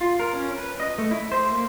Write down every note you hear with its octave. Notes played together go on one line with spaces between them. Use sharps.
F4
A#4
C#4
B4
D#5
A3
E4
C5
A#3